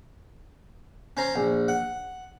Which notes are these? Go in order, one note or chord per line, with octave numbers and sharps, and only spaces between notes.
C#4 C5 A#5
A#1
F#5